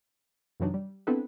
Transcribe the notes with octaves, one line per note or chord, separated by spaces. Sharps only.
F#2 C3 E3 F#3 D4 D#4
G3
B3 C4 D4 E4 A4 B4